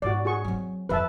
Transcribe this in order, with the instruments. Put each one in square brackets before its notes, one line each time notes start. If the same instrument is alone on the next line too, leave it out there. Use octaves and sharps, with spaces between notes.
[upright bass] G#2 G#3 [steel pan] F#4 D5
[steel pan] F#4 G#4 C#6
[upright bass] F#3 C4
[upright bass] F2 F3 [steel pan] B4 E5 A5